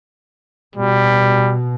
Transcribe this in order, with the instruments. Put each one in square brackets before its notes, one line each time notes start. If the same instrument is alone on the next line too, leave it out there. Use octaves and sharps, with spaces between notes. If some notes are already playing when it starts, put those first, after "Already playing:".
[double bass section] B2 [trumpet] G3